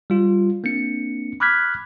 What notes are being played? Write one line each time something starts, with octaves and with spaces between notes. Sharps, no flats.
G3 F4
A#3 C4 D4 C#7
B5 D6 F6 F#6 G#6 B6